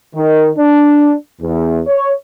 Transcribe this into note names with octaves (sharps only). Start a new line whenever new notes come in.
D#3
D4
E2
C#5